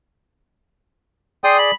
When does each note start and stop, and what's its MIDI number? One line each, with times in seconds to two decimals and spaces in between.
1.44 1.71 68
1.44 1.71 74
1.44 1.57 79
1.44 1.57 84
1.44 1.57 87
1.59 1.74 83